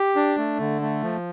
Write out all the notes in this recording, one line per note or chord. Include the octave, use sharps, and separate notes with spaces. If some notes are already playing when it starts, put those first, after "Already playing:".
Already playing: G4
D4
A3
D3
A3
F3